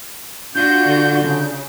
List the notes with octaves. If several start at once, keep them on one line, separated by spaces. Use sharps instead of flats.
D4 F4 F#4 G6
D3
C#3